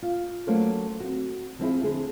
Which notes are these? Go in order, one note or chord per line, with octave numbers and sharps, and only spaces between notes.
F4
F#3 A3 A#3 C#4 C5
C4 F#4
F3 C4 E4 G#4
D3 G#4 C5